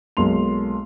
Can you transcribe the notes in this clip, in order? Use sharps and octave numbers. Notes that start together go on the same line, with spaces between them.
B1 G#3 A#3 C6 F7